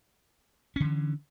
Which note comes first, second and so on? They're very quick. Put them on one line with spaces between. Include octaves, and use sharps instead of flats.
C#4 D3 E3